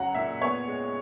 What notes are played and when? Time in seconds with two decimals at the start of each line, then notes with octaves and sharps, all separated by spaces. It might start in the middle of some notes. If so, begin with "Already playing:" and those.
Already playing: C#2 F#3 C#4 F#5 A#5
0.15 A#2 E5
0.42 B3 C#5
0.68 G#3